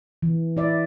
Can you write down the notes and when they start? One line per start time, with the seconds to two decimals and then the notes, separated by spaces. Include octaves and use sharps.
0.22 E3
0.57 E4 D5 E5